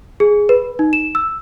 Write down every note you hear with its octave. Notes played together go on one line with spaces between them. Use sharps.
G#4
B4
D#4
E7
E6